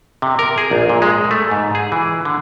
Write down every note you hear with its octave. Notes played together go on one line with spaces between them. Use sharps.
C3
A#4
G#4
A#1
A#2
G#3
A3
G#2
G#4
E3
D3